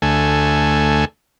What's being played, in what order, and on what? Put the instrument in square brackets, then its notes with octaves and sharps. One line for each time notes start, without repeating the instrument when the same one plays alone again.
[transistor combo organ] D2 A3 G#5